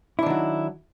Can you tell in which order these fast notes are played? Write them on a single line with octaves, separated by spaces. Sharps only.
E4 D4 D#3 F#3